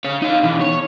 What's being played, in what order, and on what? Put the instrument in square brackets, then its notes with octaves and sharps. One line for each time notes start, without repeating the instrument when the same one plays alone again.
[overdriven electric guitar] C#5 F5
D#4 F5
B2 E3
C#5